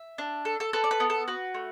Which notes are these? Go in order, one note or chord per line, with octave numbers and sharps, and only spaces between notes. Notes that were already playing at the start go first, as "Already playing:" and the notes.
Already playing: E5
D4
A4
A4
A4 B4
D5
B4
B3
A4
F#4 B4
A3